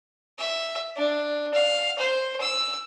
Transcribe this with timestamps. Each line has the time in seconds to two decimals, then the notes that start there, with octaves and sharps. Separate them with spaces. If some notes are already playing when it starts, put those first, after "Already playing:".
0.39 E5
0.96 D4
1.54 F5
1.98 C5
2.41 E6